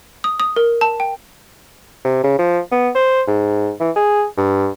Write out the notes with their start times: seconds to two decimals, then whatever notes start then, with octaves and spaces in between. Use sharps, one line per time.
0.24 D#6
0.40 D#6
0.56 A#4
0.81 A5
1.00 G5
2.05 C3
2.24 C#3
2.39 F3
2.72 B3
2.95 C5
3.28 G#2
3.80 E3
3.96 G#4
4.37 G2